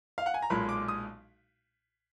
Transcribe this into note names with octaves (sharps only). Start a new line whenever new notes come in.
F5
F#5
G#5
A#5
B1 A#2 G#3 B5
D6
D#6